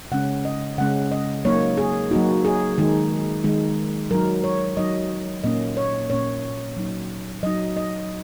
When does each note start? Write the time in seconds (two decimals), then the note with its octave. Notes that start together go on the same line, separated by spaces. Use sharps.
0.12 C#3 G#3 C#4 F#5
0.45 D#5
0.78 C#3 G#3 C#4 F#5
1.12 D#5
1.45 F#3 A#3 D#4 C#5
1.78 G#4
2.11 F#3 A#3 D#4 F#4
2.45 G#4
2.78 D#3 G#3 D#4
3.44 D#3 G#3 D#4
4.11 F#3 D#4 A#4
4.44 C#5
4.77 F#3 D#4 D#5
5.44 A#2 A#3 C#4 D#5
5.77 C#5
6.10 A#2 A#3 C#4 C#5
6.77 F#3 D#4
7.43 F#3 D#4 D#5
7.76 D#5